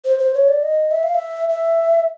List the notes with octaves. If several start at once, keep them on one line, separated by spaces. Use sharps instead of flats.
C5
C5
C#5
D5
D#5
E5
F5
E5
E5